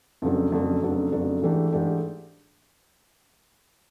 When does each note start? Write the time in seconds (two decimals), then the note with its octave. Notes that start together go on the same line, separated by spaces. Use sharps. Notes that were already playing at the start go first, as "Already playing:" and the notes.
0.22 F2 C#3 F#3 A3 D4
0.52 F2 C#3 F#3 A3 D4
0.82 F2 C#3 F#3 A3 D4
1.12 F2 C#3 F#3 A3 D4
1.42 G#2 E3 A3 D4 G4
1.72 G#2 E3 A3 D4 G4